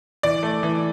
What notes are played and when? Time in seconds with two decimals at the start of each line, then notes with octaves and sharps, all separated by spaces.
0.23 E3 D5
0.43 A3
0.63 E3